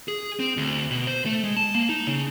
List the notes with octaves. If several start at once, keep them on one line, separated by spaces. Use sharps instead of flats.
G#4
C4
D2
B2
C5
A3
G#3
A5
A#3
D#4
C#3